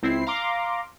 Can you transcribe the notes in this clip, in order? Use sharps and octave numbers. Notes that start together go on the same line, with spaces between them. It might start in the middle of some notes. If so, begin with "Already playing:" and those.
C#2 C4 E4 C7
F5 A#5 C6 D6